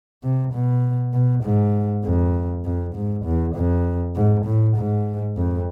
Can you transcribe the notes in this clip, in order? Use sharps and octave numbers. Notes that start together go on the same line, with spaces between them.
C3
B2
B2
G#2
F2
F2
G#2
E2
F2
G#2
A2
G#2
F2